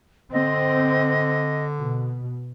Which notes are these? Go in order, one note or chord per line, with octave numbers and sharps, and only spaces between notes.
D3 C4 D#5
B2